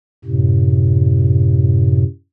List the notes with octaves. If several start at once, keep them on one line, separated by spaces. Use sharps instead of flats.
F#2 A2 C3